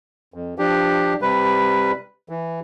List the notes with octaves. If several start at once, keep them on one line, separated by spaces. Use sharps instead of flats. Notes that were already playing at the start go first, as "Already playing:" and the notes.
F2
F3 D4 G4
C3 G3 B4
E3